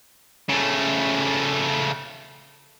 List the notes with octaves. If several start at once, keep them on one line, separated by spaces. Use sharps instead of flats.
C#3 A3